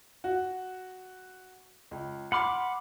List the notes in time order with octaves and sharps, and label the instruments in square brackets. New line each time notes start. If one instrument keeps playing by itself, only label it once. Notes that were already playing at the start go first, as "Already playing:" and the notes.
[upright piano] F#4
C#2
[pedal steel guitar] F#5 B5 D6 [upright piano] C6 F6